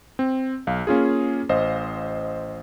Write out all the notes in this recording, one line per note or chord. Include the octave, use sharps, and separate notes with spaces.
C4
B1 F5
A#3 C#4 F4 G#4
A1 C5 D#5 F5